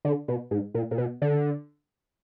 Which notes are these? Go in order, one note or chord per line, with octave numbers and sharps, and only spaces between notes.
D3
B2
G#2
A#2
A#2
B2
D3